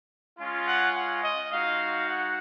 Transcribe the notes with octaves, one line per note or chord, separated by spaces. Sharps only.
G#3 C#4 F4
F#5
F#5
D#5
G#3 D#4 F#4 F5
F#5